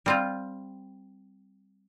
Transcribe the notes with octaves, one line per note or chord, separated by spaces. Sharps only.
G3 C4 F4